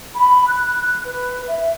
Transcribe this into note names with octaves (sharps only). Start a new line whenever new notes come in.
B5
F#6
F#6
B4
E5